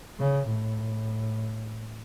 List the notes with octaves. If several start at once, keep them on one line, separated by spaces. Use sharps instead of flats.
C#3
A2